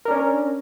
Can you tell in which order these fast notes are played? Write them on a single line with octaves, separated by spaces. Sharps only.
A#4 D4 C#4